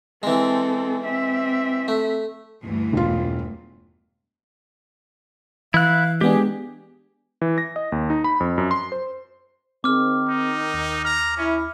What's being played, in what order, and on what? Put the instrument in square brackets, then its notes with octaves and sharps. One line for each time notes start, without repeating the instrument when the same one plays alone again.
[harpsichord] E3 G#3 [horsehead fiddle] C4 A4
[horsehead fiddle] C4 E5
[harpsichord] A3
[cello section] D2 G2 E3
[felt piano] E1 F4
[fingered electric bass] E3 [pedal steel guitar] E4 F#6 [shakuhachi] F5
[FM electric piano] G#3 B3 D4 [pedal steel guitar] G4 [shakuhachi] G#4
[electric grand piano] E3
A#6
D#5
D#2
D#4
B5
F2
F#2
C6
C5
[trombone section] D#3 [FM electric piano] C4 G#4 [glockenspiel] D6 F6
[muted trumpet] D#4
[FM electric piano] D#2
[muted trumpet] A#5 [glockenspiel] F6
[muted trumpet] C#4 [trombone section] E4